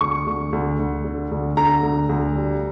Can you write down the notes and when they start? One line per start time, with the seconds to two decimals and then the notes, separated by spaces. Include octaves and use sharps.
0.01 D2 C#6
0.27 D2
0.53 D2
0.79 D2
1.04 D3
1.31 D2
1.57 D3 A#5
1.83 D2
2.09 D2
2.36 G3